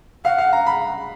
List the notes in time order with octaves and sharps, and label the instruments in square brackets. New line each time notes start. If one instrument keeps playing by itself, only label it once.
[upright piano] F5 [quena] F#5
[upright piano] F5
A#5
B5